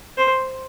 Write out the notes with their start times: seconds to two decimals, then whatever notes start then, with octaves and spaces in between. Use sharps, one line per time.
0.18 C5